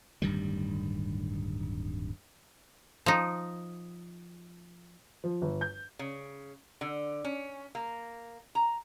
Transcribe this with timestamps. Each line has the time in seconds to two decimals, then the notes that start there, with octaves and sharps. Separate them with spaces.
0.22 D1 G2 D#3 G3
3.06 F3 D#4
5.24 F3
5.42 G1
5.61 G6
5.99 C#3
6.81 D3
7.24 C#4
7.75 A#3
8.55 A#5